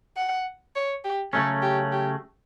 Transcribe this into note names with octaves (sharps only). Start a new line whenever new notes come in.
F#5
C#5
G4
C#3 F#3 A3 C#4 A4
G4
G4